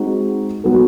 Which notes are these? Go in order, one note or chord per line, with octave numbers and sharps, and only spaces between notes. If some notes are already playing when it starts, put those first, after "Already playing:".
Already playing: G#3 C4 D#4 F#4
F#3 B3 D#4 F#4 A4